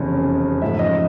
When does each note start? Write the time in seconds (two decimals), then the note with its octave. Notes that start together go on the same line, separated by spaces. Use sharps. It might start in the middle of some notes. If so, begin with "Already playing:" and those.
Already playing: F1 E2 C#3
0.61 A1 G#2 F3 A3 E5
0.79 D#5